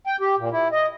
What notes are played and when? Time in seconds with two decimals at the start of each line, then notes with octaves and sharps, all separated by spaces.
0.07 G5
0.20 G4
0.38 A#2
0.52 E4
0.72 D#5